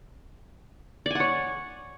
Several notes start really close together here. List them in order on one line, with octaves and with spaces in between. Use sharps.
D5 G#5 F#5 C#5